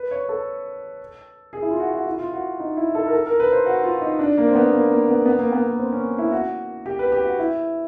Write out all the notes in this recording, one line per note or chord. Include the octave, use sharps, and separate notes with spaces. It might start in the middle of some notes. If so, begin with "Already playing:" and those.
Already playing: B4
C#5
A4
G#4
E4
F4
F#4
F#4
E4
F4
F#4
D#4
E4
A4
A#4
A4
A#4
B4
C5
F#4
F4
D#4
D4
A#3
C4
B3
A#3
A#3
B3
B3
A#3
B3
A#3
C4
C#4
E4
F#4
G4
B4
G4
F#4
E4